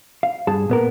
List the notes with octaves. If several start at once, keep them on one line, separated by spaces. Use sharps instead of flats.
F5
G2 G#4 A5
A#2 B3 A#4